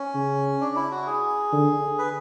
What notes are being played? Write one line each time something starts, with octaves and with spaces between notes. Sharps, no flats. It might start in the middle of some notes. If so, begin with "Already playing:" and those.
Already playing: C#4
C#3
D4
E4
F#4
G#4
D3
B4